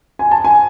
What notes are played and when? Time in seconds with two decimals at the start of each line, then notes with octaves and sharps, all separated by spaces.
0.19 G#5
0.31 A5
0.44 G#5